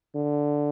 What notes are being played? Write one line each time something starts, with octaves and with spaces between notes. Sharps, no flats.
D3